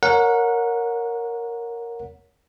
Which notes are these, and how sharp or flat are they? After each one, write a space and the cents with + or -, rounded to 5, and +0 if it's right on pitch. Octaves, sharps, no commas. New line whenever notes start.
A#4 +0 C#5 +10 F#5 -25